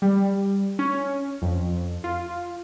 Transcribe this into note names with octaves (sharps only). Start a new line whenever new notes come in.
G3
C#4
F2
F4